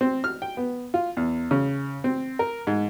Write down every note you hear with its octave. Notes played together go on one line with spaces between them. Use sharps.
C4
F6
G5
B3
F4
E2
C#3
C4
A#4
G#2